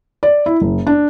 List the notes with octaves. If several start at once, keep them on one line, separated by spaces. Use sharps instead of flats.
D5
E4
F#1
D4